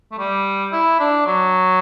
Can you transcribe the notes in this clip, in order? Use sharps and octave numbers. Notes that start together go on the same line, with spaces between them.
A3
G3
E4
D4
F#3